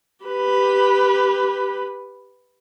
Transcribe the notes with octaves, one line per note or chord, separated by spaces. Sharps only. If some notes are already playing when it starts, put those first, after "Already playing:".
G4 B4